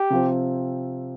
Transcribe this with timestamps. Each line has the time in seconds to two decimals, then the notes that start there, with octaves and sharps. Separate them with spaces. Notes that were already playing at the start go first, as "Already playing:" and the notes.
Already playing: G4
0.10 C3 F3 C4